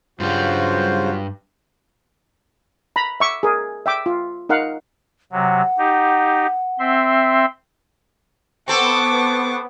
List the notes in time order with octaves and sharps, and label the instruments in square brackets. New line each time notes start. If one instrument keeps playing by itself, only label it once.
[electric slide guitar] G2 G3 [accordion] C#3 C5 [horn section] F#3 F4 F#4
[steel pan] A#5 B5
E5 C#6 D6
G#4 A#4
E5 G5 D6
F4
D#4 A#4 F5 F#5
[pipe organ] C3 F#3 [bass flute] F#5
[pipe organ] D#4 G4
C4 E5 C6
[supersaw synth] B3 [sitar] C4 A4 [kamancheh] C#6 D6